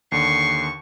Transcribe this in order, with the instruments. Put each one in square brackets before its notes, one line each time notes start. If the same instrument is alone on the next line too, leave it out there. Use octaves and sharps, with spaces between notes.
[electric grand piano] D#2 D3 [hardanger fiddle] C#6 [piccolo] C7